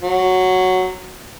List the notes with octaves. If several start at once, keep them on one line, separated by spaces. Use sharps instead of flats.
F#3